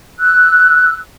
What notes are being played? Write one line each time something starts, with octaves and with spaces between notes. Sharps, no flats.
E6 F#6